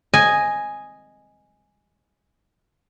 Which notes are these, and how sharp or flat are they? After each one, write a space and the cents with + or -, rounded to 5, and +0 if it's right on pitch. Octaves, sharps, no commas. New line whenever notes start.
D#5 +0 G#5 +0